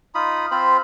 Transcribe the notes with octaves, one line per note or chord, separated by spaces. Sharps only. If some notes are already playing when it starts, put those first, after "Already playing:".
D#4 F4 B5 D#6
C4 F4 C5 B5